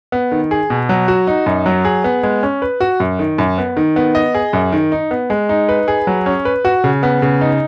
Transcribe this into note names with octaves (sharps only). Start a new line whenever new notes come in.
B3
D#3
G#4
B2
F#3
F#4
D#4
F#2
F#3
G#4
B3
G#3
C#4
B4
F#4
F#2
D#3
F#2
B3
D#3
B3
D#5
G#4
F#2
D#3
D#4
B3
G#3
D#4
B4
G#4
F#3
C#4
B4
F#4
C#3
B3
C#3
D#4